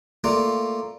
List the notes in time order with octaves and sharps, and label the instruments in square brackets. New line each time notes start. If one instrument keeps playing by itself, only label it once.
[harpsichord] A3 A#3 F4 D5